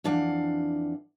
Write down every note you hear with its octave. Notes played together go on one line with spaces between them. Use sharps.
F2 E3 D4 F5 F#5